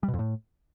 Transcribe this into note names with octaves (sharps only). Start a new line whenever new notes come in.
G3
B2
F2
A2